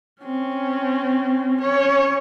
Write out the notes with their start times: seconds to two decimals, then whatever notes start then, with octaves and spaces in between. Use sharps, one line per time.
0.22 C4 C#4
1.61 C#4 C#5